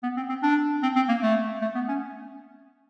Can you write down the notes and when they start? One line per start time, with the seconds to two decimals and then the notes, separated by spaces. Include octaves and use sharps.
0.03 B3
0.17 C4
0.29 C4
0.43 D4
0.83 C4
0.96 C4
1.08 A#3
1.22 A3
1.62 A3
1.75 B3
1.88 C#4